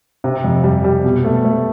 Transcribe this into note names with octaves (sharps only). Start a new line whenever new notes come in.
C3
F2
G3
G3
B2
A3
A3